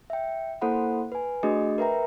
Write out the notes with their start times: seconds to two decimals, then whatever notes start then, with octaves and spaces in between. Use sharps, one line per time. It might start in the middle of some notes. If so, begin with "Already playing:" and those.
0.10 E5 G5
0.61 A#3 E4 A4 C5 F#5 B5
1.12 B4 G#5
1.43 A3 D4 F#4 G#4 D#5
1.78 A#4 B4 E5 G5 A#5